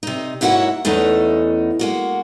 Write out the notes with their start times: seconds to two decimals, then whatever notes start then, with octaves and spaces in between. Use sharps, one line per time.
0.03 C3 D#4
0.41 G#2 A#3 E4 F#4 C#5 F#5
0.85 E2 E3 A3 C#4 D#4
1.79 G#3 A#3 F#4